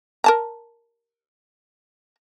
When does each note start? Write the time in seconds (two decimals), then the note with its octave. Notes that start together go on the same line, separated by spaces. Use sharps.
0.24 A#4 A5 A#5